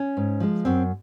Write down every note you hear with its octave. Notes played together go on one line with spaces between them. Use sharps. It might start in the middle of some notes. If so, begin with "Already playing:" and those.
Already playing: C#4
G#2
F3 G#3
F#2 C4